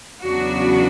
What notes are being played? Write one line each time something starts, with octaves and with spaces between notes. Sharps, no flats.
E2 C#3 F#3 B3 D4 F#4